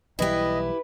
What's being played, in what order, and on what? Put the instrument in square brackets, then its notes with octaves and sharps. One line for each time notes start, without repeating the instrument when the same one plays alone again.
[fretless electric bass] B1 E3 G3 [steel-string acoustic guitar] E4 G4 [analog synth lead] B4 [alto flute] D#5